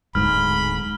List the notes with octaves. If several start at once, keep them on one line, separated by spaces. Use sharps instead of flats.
D1 G#2 B5 F6